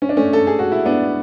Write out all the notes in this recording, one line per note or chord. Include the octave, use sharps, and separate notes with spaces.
C#4
D4
A3 C#4
A4
G#4
F#4
E4
B3 D4